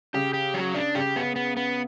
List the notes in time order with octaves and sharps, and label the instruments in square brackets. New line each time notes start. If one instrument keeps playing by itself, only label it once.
[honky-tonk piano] C#3 [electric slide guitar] G4
[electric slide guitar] G4
F#3
D4
[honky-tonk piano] C#3 [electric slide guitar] G4
[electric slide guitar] B3
B3
B3